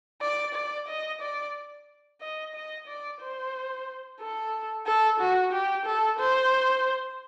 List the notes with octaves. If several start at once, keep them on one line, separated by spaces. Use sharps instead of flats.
D5
D5
D#5
D5
D#5
D#5
D5
C5
A4
A4
F#4
G4
A4
C5